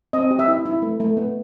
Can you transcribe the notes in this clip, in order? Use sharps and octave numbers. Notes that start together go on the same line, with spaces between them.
C4 D#5
G4
E5
E4
E4
A3
A3
B3